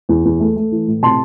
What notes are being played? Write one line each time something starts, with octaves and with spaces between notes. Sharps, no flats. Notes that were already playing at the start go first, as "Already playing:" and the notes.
E2
E2
A3
A3
E3
A2
C3 A5 C6